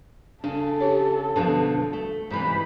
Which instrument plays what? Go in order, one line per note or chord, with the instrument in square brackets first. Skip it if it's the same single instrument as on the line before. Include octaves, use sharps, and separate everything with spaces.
[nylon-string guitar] C#3 [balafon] D4 [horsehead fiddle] A4
[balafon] G4 C#5
[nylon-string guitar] B2 D3 F3 [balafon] D4
[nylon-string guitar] A3
[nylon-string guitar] G#2 C3 E3 [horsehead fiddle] B5